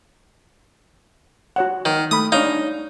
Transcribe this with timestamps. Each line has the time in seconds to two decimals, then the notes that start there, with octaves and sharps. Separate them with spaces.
1.56 F#4 C#5 F#5
1.85 D#3
2.11 A3 B5 D#6
2.32 D4 D#4 C#5 F5